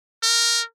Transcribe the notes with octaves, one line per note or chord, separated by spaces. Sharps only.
A#4